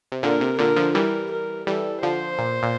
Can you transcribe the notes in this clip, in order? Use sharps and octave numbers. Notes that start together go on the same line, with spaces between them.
C3
A#2 D3 A#4
C3
A#2 D3 A#4
D3 F3
E3 G3 A#4
A#4
E3 G3 A4
D3 F3 C5
A#2
A#2